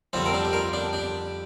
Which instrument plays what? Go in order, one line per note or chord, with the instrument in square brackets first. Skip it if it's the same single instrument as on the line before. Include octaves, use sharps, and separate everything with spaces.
[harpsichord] F2 D3 G3 C4 F4
A#4
D4 G4
G4
F4 A#4
D4 G4
D4 G4